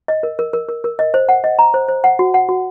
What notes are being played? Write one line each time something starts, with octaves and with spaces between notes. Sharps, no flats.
D#5
A#4
A#4
A#4
A#4
A#4
D#5
C5
F#5
D#5
A#5
C5
C5
F#5
F#4
F#5
F#4